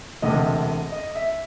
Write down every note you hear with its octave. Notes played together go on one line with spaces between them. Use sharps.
E1 D2 C3 D#5
D#5
E5